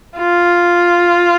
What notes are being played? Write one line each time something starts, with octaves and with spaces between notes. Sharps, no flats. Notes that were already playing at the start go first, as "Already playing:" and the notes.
F4